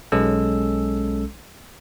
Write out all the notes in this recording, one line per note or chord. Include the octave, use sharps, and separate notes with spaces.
B1 G#3 C#4 A4 E6